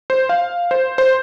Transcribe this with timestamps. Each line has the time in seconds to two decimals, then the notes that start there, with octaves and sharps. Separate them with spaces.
0.10 C5
0.29 F5
0.71 C5
0.98 C5